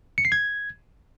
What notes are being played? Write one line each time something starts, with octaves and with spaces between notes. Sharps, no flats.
C#7
C7
G#6